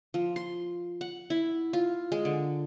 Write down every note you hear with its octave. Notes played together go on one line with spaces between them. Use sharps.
F3
C6
F#5
E4
F4
G#3
D3